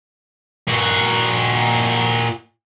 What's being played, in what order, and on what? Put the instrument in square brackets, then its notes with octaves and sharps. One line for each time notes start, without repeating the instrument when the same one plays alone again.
[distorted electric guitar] A#2 F#4